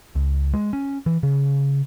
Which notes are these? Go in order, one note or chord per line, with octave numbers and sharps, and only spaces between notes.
C#2
G#3
C#4
E3
C#3